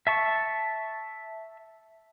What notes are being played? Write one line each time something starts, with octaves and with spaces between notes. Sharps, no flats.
E5 A5 C#6